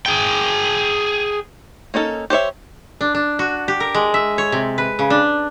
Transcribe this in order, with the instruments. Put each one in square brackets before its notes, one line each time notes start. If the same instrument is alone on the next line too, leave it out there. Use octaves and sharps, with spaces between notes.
[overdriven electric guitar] G#4 G5
[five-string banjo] A#3 C#4 D#4 A4
G4 C5 C#5 E5
[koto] D4
D4
F#4
G4
A#4
G#3
E5
C#5
C3
B4
C#3
D4